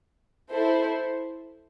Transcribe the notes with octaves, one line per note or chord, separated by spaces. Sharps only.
E4 A4 C5